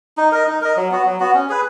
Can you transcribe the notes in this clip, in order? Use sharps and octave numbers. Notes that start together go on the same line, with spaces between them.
D#4
A#4 D#5
D#4
A#4 D#5
F#3
B3 F#4
F#3
B3 F#4
C#4
G#4 B4